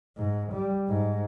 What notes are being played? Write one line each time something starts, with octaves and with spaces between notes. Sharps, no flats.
G#2
G3
G#2